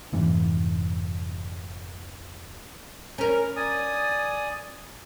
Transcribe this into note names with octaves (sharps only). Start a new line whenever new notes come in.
F1 G#2 E3
C#4 A#4 A#5
D5 G#5 D#6